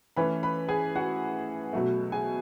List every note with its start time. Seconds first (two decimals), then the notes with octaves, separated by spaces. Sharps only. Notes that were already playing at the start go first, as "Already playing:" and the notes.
0.17 E3 A3 C#4 B4 B5
0.43 B4 B5
0.68 G#4 G#5
0.96 F#4 F#5
1.73 B2 F#3 A3
2.12 G#4 G#5